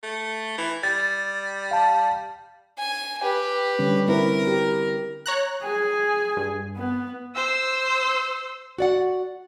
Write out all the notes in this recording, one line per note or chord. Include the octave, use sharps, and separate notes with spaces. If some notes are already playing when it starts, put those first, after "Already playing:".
A3
E3
G3 A6
F5 A5
G#5
G4 B4
D3 G3 C#4
C4 E4 A#4 B4
G4
C#5 A#5 F#6
G#4 G#5
G2
B3
C5 E6
F#4 D5 F#5